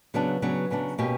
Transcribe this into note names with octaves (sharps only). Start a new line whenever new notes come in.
C#3 F#3 B3 D4
C#3 F#3 B3 D4
C#3 F#3 B3 D4
B2 A#3 C#4 G4